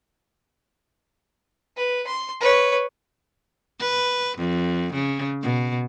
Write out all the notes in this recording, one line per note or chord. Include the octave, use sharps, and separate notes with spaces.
B4
C6
B4 C#5
B4
F2
C#3
B2